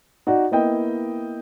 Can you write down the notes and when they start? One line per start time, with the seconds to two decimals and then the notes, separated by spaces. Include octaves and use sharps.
0.27 D#4 F#4 D5 F#5
0.52 A#3 B3 E4 D#5 G5